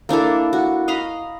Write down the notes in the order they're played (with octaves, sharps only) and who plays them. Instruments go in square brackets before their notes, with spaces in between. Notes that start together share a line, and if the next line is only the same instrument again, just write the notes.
[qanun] A#3 D4 E4 A4
F#4
D#5 F5 A#5 B5